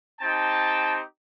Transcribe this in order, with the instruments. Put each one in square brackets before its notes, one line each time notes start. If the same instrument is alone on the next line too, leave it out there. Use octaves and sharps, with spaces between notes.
[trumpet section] C4 D#4 G4 G5 A5